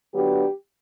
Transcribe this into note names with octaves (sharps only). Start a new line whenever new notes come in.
D3 F#3 B3 D4 G4